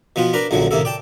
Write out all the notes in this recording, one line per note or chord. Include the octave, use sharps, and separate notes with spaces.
B2 F3 B3 F4
D4 A#4 B4 A#5
A#1 F#2 D3 F3 F#3
D#2 A2 C3 A#3 A4
D5 G5 A5